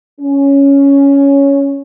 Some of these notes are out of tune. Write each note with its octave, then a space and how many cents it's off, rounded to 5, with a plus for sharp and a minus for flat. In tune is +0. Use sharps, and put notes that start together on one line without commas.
C#4 +5